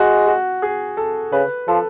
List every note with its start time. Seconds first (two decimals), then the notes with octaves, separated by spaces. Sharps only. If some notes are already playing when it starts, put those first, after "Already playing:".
Already playing: G#3 F#4
0.28 F#4
0.62 G#4
0.97 A4
1.32 C#3 B4
1.68 F3 A4